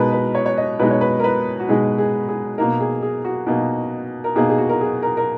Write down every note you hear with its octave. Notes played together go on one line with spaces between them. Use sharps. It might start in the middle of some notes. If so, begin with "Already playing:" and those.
Already playing: B2 G#3 D#4 A#4 B4
B4
C#5
C#5
D#5
B2 G#3 D#4 B4
C#5
B4
A#4
B4
F#4
B2 G#3 D#4 G#4
G#4
G#4
B2 A#3 D#4 A#4
G#4
G#4
F#4
B2 A#3 D#4
A#4
B2 A#3 D#4 G#4
G#4
F#4
A#4
G#4
A#4
A#4